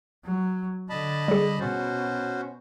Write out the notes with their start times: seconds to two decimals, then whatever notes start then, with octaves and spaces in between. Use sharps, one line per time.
0.25 F#3
0.90 D3 D#5 A5 B5
1.28 G3 G#4
1.60 B2 C#4 F#4 C5